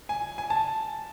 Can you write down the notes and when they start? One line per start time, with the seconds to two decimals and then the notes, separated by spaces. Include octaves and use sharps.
0.09 G#5
0.38 G#5
0.50 A5